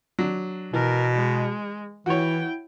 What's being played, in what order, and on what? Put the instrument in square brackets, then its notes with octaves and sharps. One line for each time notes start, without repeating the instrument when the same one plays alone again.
[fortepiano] F#3 D4
[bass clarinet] B2 [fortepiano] E3 [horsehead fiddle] A#4
[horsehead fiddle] G#3
[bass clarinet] E3 [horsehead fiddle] E4 G5 [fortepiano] F#4 C#5